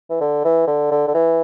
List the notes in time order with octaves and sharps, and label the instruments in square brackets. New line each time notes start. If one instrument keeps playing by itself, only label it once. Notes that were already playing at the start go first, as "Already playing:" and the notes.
[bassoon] E3
D3
E3
D3
D3
D3
E3